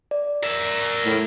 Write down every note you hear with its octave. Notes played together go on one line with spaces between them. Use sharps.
D5
A#4 E5
A2